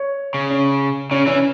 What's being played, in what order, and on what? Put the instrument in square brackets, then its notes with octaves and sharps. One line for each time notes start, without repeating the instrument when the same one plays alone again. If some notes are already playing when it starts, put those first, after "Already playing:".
Already playing: [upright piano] C#5
[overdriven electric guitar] C#3
[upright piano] C#4
[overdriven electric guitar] C#3 [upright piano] C#4
[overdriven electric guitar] E3 [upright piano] C#4